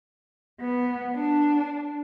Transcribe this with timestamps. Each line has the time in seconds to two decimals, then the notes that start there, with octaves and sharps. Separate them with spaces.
0.60 B3
1.17 D4